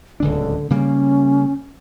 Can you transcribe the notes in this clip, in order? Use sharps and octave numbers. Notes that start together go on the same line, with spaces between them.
D1 C#2 D3 D4
C#3 G3 A#3 C#4